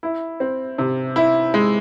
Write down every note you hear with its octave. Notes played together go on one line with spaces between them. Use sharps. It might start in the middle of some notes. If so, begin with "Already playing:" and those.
E4
C4
C3
E4
G#3